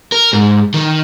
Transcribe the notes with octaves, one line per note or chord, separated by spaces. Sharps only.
A#4
G#2
D#3